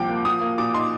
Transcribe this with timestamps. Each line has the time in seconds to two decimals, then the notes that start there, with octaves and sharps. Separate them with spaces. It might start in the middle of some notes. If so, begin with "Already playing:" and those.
Already playing: C2 A#2 F3 G5 D6
0.09 A#3
0.25 F3 D#6
0.41 A#3
0.58 A#2 D6
0.74 D#4 C6